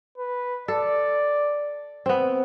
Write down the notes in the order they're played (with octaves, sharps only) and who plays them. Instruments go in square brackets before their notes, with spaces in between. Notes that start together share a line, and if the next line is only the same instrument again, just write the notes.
[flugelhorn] B4
[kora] A4 [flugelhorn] D5
[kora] B3 C4